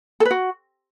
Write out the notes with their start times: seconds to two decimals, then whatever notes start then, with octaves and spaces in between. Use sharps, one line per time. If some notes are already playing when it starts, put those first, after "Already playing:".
0.20 A4
0.25 B4
0.31 F#4